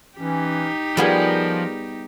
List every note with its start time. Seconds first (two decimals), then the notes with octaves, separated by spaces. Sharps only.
0.18 E3 C#4 D#4 G4
0.97 F3 G3 B3 F4 G#4 A#4